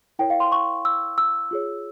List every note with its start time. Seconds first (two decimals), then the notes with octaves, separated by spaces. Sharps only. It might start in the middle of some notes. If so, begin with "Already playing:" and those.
0.19 E4 A#4 C#5 G5
0.30 F5
0.40 C6
0.52 C#6
0.85 E6
1.18 E6
1.51 F4 G#4 C#5